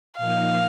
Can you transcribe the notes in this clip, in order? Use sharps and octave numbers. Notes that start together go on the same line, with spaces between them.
A#2 F3 A#3 D#4 F5